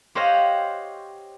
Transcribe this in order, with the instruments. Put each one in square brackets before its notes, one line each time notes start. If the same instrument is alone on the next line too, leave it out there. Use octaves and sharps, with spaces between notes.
[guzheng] G4 C5 C#5 D#5 F5 F#5